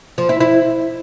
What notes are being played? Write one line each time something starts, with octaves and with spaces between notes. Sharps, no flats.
F3
E4
E4